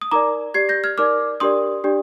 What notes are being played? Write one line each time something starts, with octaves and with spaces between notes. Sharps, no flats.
D#6
D#4 A#4 D5 A#5 D6
G4 D5 G#6 C7
G6 A#6
F6 G#6
D#4 A#4 D5 D6 F6
D4 G4 A#4 D5 C6 D#6
D4 G4 D5